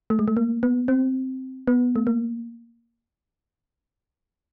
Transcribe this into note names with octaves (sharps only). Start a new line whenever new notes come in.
A3
G#3
A3
A#3
B3
C4
B3
A3
A#3